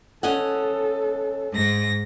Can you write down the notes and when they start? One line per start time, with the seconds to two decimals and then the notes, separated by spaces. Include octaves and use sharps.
0.23 C#4 A4 D#5 F#5
1.52 G#2 A#6